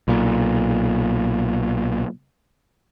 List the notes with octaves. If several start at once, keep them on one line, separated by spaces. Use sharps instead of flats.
B1 A#2